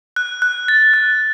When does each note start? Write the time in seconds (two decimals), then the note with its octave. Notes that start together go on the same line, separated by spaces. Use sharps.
0.16 F#6
0.42 F#6
0.68 A6
0.94 F#6